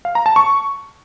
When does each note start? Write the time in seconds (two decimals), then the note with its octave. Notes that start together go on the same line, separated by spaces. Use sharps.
0.05 F5
0.15 A#5
0.26 A5
0.36 C#6